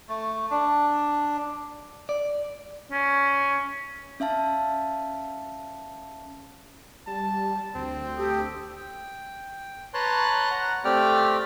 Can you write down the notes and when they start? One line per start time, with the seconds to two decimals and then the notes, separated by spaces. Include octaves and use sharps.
0.09 A3
0.51 D4
2.09 D5
2.92 C#4
4.20 C#4 E5 F5 A5
7.07 G3 A5
7.75 D2 C4
8.16 G4 A4 D#6
8.76 G5
9.94 B4 C#5 A5 A#5 C6 F#6
10.51 F#5 A#5
10.85 A3 C4 G4 D5 G5 F6